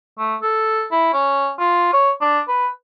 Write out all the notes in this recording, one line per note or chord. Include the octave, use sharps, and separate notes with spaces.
A3
A4
E4
C#4
F4
C#5
D4
B4